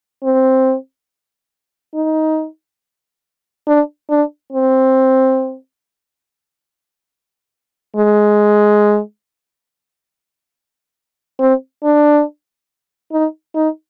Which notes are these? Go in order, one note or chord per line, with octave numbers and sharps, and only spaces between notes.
C4
D#4
D4
D4
C4
G#3
C4
D4
D#4
D#4